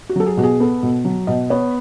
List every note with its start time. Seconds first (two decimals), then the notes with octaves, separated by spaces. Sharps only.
0.09 F#4
0.16 F#3 A4
0.26 G#4
0.37 B2 F#4
0.44 G#4
0.60 B3 A4
0.83 B2
1.05 F#3
1.27 B2 D#5
1.50 B3 C#5